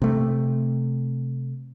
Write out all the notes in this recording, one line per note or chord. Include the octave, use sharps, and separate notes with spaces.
C3 A3